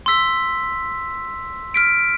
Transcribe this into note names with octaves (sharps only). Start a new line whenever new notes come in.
C6 E6 B6
F6 B6 D7